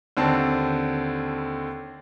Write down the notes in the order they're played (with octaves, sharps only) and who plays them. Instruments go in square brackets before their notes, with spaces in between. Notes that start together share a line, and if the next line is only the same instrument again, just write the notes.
[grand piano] D#2 D3 C4 A5